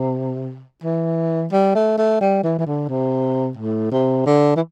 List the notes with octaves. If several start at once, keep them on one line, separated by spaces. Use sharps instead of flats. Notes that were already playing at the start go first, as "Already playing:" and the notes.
Already playing: C3
E3
G3
A3
A3
G3
E3
E3
D3
C3
A2
C3
D3
E3